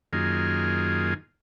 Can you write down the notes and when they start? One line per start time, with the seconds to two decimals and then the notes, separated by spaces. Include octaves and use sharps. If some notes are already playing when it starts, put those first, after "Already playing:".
0.13 F#2 D#3 A#3 F4 G#4